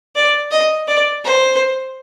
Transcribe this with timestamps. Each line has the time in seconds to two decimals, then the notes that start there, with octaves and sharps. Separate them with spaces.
0.16 D5
0.51 D#5
0.88 D5
1.25 C5